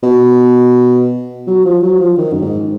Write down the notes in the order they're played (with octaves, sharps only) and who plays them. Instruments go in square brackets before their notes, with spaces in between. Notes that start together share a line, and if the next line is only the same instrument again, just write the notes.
[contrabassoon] B2
F#3
F3
F#3
F3
D#3
F#2
G#2